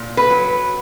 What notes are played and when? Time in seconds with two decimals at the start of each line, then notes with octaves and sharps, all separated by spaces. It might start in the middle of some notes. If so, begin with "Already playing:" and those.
Already playing: A#2
0.17 B4
0.30 F#3